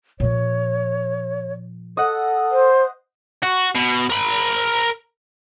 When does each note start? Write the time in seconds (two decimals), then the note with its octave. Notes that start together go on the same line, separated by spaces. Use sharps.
0.20 A#2 F3 C#5
1.97 A4 D#5 F#5
2.51 C5
3.43 F#4
3.75 B2
4.10 A#4 B5